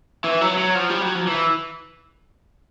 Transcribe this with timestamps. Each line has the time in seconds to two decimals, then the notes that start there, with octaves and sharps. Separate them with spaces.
0.24 E3
0.41 F#3
0.58 F#3
0.75 F3
0.90 G3
1.02 F#3
1.15 F3
1.27 E3